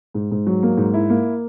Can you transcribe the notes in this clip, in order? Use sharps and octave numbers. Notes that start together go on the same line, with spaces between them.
G#2
G#2
F#3
A#3
G#2
E4
A#3